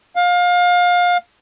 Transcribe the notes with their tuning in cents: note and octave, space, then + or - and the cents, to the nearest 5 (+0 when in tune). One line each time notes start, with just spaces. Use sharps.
F5 +25